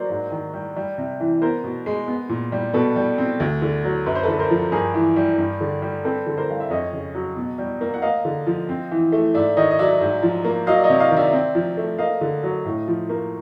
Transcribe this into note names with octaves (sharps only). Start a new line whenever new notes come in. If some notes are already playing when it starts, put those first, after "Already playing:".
Already playing: F#3 A#3 C5 D5
G#2
D#3
G3
G3
C3
E3
B3 A#4 C5
B2
G#3
B3
A#2
G3
B2 A4 B4
G3
C4
D2
D3
F#3
F#2 B4
C5
D3 A4 B4
A#4 C5
F3
G2 G#4 A#4
E3
G3
G2
D3
G3
C4 A4 B4
D3
A#4 C5
G3 F5
E5
F2 C#5 D#5
C#3
F#3
B2
G3
A#3
F#5
A#3 D#5 F5
D3
F3
C4
E3
A3
G#2 D5 E5
D#3 C#5 D#5
D#5
F#3 D5 E5
G#2
F3
A#3
F#3 D#5 F5
D5
C#5 D#5
C3
D#5 F5
D#3
D5 E5
C4
F3
A3
A#3 D#5 F5
D3
F#3
A2
F3
A#3